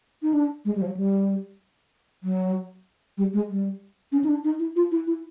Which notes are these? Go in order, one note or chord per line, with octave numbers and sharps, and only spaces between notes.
D#4
D4
G#3
G3
F3
F#3
G3
F#3
G3
G#3
G3
C#4
D#4
D4
D#4
E4
F4
E4
E4